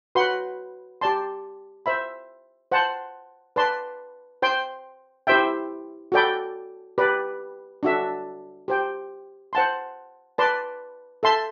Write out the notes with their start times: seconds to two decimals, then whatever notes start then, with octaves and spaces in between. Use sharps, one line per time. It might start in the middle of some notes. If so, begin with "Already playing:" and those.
0.15 F#4 B4 F#5 C6
1.01 G4 D5 A5 C6
1.86 C5 E5 B5
2.72 C5 F#5 A5 C6
3.56 B4 D5 A5 C6
4.42 C5 G5 C6
5.27 E4 G4 C5 E5 G5
6.12 F#4 A4 D5 G5 B5
6.98 G4 B4 D5
7.83 D4 F#4 A4 E5
8.68 G4 C5 G5
9.53 C5 F#5 A5 C6
10.38 B4 D5 A5 C6
11.23 A4 E5 A5 C6